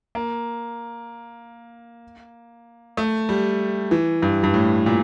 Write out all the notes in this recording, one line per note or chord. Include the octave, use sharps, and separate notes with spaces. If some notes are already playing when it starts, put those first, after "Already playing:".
A#3
A3
G3
E3
G2
G2
A2
A#2